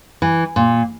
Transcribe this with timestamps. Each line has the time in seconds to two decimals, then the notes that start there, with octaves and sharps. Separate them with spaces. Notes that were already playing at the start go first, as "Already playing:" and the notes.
0.22 E3
0.56 A#2